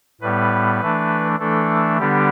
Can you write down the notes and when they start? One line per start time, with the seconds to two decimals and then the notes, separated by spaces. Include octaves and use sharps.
0.21 A2 G3 B3 B4
0.80 E3 A3 D4
1.39 E3 A3 D4 A4
1.99 D3 G3 B3 D4 G4